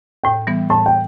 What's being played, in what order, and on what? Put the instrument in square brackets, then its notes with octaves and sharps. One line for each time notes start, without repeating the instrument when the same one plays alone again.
[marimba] A2 [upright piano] G5
[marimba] E3 G3 B3
[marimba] A2 [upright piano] A5
[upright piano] G5